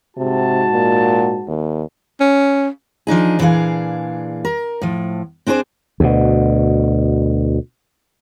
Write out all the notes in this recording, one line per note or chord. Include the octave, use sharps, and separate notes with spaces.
G#2 C3 F#4 A5
A#2
D#2
C#4
F3 D4 D#4 G#4
A#2 E3 D4 G#4 F5
A#4
A2 F3
C4 D4 G#4 A#4 C5
D2 B2